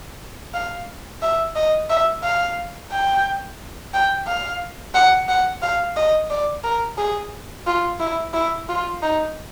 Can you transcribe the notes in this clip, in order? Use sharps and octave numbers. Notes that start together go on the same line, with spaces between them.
F5
E5
D#5
E5
F5
G5
G5
F5
F#5
F#5
F5
D#5
D5
A#4
G#4
F4
E4
E4
F4
D#4